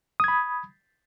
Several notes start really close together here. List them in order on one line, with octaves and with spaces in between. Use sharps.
D#6 G#6 B5